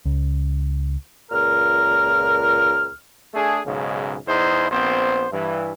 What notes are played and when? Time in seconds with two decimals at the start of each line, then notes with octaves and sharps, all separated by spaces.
0.05 C#2
1.31 C#2 A#2 A#4 F6
3.34 A3 D4 G#4
3.66 B1 G#2 C#3
4.26 E2 D#4 E4 G#4 C5
4.69 A#1 B3 C4 C5
5.31 G2 E3